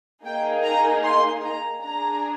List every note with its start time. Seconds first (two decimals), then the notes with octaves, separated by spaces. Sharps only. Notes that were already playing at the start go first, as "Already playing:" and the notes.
0.25 A#3 D#4 G#4 G5
0.64 A#5
1.03 C6
1.43 A#5
1.82 D4 G#4 A#5